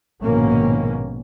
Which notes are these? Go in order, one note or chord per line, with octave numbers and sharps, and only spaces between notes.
A#1 G#2 B2 D#3 A#3 C#4